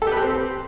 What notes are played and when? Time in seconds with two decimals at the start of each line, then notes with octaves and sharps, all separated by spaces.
0.02 A4
0.07 G4
0.12 B4
0.17 G4
0.22 C4